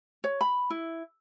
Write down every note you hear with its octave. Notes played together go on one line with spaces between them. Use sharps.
C#5
B5
E4